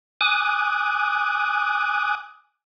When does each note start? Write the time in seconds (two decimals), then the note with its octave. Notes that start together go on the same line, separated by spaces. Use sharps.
0.21 G#5 D6 D#6 F#6